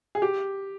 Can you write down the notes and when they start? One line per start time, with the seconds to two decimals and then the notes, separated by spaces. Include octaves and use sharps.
0.15 G#4
0.22 G4